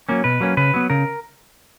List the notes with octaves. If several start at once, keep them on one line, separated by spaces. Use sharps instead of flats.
F#3 A#3 C#4
B2 B4
F#3 A#3 C#4
C#3 B4
F#3 B3
C#3 A#4